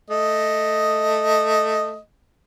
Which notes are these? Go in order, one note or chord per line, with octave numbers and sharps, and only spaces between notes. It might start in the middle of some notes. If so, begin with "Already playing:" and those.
A3 D#5